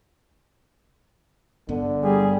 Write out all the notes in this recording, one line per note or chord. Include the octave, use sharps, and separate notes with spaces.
G1 G2 D3 B3
G3 G#4